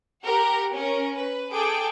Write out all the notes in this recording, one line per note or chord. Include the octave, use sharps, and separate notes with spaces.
G4 A#4 F#5
C#4 A#4
B4
G#4 A4 G5 D6 D7